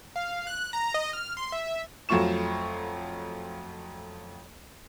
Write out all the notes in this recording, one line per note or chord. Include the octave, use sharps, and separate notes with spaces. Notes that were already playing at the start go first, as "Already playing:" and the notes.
F5
F#6
A#5
D#5
F6
C6
E5
F2 F#3 A3 F4 C#6 E7